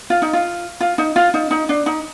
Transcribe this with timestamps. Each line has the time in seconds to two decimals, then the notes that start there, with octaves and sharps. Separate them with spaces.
0.10 F4
0.22 D#4
0.33 F4
0.80 F4
0.98 D#4
1.16 F4
1.34 D#4
1.51 D#4
1.69 D4
1.86 D#4